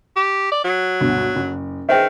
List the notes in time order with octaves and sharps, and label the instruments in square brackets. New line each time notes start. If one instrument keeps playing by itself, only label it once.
[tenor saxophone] G4
D5
F#3
[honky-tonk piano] D2 G2 B2
F#1
[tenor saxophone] D#3 [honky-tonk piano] G#4 E5 [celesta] B4 C5 G5